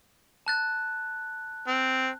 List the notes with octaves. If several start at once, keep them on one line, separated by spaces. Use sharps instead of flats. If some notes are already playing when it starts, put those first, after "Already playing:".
A5 F#6 A6
C4